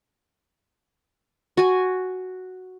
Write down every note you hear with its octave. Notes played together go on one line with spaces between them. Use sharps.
F#4 G#5